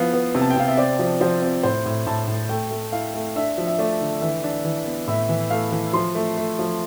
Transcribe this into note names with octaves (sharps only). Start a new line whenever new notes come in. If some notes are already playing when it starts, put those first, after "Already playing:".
Already playing: F3 B3 E4 F5
B3
C3
A5
G5
C3 F5
E5
C4 D5
F3
F3 C5
C4
A2 C5
A2
A2 A5
A2
A3 G5
A3
E4 F5
A3
D4 E5
F3
E5
A3 D5
D3
E3 E5
D4
E3
B3
A2 E5
E3
A3 F5
E3
F3 C6
A3
A3
F3